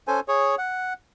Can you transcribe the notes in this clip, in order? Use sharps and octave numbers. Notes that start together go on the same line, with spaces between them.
C#4 A4 C5 G#5
G#4 C#5
F#5